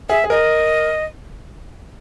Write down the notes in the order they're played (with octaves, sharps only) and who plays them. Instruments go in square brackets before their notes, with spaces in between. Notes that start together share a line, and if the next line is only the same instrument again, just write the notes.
[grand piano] G#4 [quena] E5
[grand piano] G#4
[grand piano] A#4 [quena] D#5